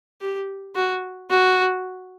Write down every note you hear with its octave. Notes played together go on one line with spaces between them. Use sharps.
G4
F#4
F#4